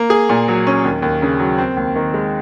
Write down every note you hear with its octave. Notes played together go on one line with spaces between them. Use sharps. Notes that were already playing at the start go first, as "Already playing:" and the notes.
Already playing: A#3
G#4
A#2
F#3
C#4
D#2
D#2
C#3
F#3
C4
D#2
D#3
G#3